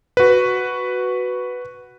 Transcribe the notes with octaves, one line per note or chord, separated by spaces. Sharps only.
F#4 B4